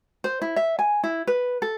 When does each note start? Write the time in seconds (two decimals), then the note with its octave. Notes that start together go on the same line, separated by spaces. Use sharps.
0.24 C5
0.42 E4
0.56 E5
0.79 G#5
1.03 E4
1.27 B4
1.62 A4